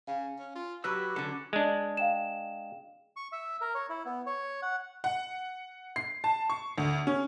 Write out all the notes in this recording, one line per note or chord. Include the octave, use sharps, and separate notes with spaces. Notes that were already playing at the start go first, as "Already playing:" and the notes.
C#3 F5 G#5
C#4
F4
F#3 F#4 G4 B4 B5 E6 F#6
D3 F#3 C#4 A4
G#3 D4
F5 G5 E7
C#6
E5
A#4
C#5
E4
B3
C#5
F#5
F#5
C7
A5
C#6
D2
C#4